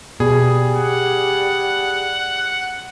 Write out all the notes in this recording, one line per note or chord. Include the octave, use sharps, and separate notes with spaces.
B2 G3 G#4
F#5